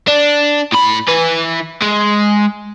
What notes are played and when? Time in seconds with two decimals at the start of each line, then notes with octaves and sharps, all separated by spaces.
0.08 D4
0.73 A2 B5
1.08 E3 B4
1.82 G#3